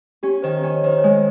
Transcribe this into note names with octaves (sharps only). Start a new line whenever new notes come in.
C#4 G4
D#3 C5
C#4 C5
C#5
D#3 C5
C#5
G#3
C5